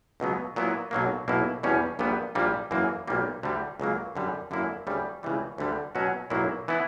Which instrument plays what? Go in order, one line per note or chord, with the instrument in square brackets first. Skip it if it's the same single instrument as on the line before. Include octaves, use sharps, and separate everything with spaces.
[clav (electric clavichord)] C#2 B2 F#3 B3
A#2 F#3 B3 E4
B1 B2 F#3 A#3
B1 B2 A#3 E4
E2 B2 G3 C#4
A#1 A#2 G3 B3
A#1 A#2 G3 A#3
F#2 E3 A#3
B1 A#2 G3 A#3
D2 D3 G3
C#2 C#3 F#3 A#3
F#2 D3 G3
F#2 D3 A#3 E4
D2 C#3 G3
C#2 C#3 E3 G3
D2 D3 G3
B2 F#3 C#4 F#4
B1 A#2 F#3 A#3 E4
E3 B3 E4